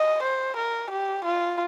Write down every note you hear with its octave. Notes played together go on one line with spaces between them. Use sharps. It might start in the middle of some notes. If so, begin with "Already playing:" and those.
Already playing: D#5
C5
A#4
G4
F4